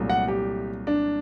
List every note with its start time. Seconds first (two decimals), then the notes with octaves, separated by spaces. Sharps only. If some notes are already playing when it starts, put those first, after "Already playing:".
Already playing: C2 A#2 F#3 A3
0.10 F#5
0.28 G4
0.87 D4